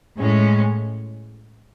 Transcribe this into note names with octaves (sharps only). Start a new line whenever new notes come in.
A2 G#3 C#4